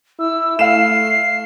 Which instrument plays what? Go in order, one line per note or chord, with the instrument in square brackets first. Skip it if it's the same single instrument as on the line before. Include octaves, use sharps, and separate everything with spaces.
[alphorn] E4 [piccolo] E6
[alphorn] A3 [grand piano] F5 E7 [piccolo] C7